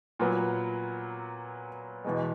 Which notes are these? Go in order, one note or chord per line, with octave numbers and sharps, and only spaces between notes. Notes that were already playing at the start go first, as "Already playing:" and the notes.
A#2 F#3 B3
E2 B2 G#3